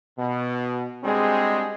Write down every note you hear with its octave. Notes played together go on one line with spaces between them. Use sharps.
B2
G3 G#3 C4 D4 F#4 G#4